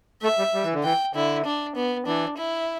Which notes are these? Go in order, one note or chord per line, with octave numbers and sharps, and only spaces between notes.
A3 E5
G3
G3
E3
D3
E3 G5
D3 E4
D4
B3
E3 D4
E4